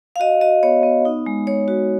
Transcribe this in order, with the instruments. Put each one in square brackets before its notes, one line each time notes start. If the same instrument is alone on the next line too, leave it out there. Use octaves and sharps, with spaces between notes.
[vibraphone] F5
F#4 D#5
F#4 D#5
B3 C#5
B3
D#4
G#3
G#3 C#5
F#4